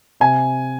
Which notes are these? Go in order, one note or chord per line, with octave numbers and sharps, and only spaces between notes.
C3 G#5